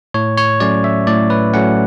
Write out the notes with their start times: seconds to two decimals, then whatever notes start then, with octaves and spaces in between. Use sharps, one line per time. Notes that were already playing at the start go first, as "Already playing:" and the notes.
0.14 A2 C#5
0.37 C#5
0.60 F#3 A3 C#4 D5
0.84 E5
1.07 A2 D5
1.30 B4
1.54 F#3 A3 C#4 F#5